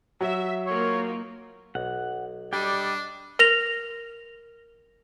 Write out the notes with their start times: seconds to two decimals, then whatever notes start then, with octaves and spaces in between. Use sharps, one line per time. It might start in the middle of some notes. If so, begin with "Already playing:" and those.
0.21 F#3 E5
0.66 A#3 D#4 F4 C#5
1.75 B1 F#5
2.53 G3 D4 D#5 G5
3.39 A#4 A#6 F7